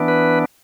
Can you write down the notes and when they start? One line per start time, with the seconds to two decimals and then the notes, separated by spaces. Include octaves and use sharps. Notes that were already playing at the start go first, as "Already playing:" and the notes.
Already playing: E3 B3 D4
0.08 B4